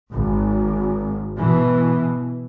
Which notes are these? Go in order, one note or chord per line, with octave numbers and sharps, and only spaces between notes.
G#1
B2 E3